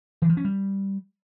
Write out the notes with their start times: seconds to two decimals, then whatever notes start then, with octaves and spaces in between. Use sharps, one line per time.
0.22 E3
0.29 F3
0.37 C#4
0.45 G3